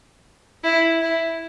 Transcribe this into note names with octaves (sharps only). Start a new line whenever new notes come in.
E4
E4